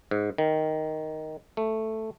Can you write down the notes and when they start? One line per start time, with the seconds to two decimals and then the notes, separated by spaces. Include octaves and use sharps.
0.11 G#2
0.38 D#3
1.57 A3